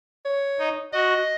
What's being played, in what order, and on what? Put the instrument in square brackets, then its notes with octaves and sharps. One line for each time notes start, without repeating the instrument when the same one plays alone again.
[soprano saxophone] C#5
[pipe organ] D#4
[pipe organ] F#4 [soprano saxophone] D#5